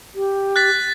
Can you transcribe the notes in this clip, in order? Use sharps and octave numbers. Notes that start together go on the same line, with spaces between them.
G4
F#6 A6 B6